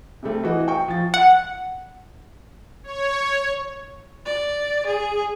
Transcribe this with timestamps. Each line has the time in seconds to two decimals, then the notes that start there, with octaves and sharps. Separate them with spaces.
0.23 C3 G3 A3 C4
0.43 E3 F#4 D#5
0.68 G5 C#6
0.88 F3 A6
1.14 F#5
2.84 C#5
4.25 D5
4.87 G#4